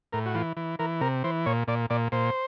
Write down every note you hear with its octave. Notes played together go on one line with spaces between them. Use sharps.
A2 A#4
F#4
E3 F4
E3
E3 A#4
C3 A#4
E3 C5
A#2 C#5
A#2 D5
A#2 D5
A#2 C5